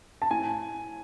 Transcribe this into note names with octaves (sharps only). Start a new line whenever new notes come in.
A5
A2 G#5